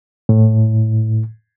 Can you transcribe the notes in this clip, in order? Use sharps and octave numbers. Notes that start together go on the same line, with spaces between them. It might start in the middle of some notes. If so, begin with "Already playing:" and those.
A2